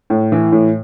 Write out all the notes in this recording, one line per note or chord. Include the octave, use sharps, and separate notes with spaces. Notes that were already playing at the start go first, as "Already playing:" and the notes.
A2
E3
A2